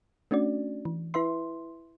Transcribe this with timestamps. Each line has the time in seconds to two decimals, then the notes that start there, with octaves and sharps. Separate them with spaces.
0.31 A3 C#4 D4 F#4 D5
0.85 E3
1.14 E4 B4 E5 C6